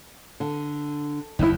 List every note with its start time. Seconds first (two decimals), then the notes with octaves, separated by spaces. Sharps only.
0.40 D3
1.39 F#1 D#2 D#4 E4